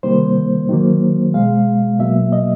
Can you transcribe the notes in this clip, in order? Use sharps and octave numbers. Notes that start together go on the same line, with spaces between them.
C3 D#3 G3 A#3 C5
D#3 F#3 A#3
B2 G#3 F5
B2 F#3 A#3 E5
D#5